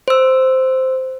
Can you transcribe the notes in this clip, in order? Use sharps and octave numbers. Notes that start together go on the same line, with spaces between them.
C5 E6